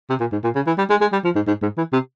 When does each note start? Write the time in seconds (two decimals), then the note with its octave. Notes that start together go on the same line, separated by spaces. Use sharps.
0.10 C3
0.20 A#2
0.32 G#2
0.44 A#2
0.55 C#3
0.67 E3
0.78 G3
0.90 G#3
1.01 G#3
1.12 G3
1.24 F3
1.36 G#2
1.47 G#2
1.62 G#2
1.77 E3
1.93 C3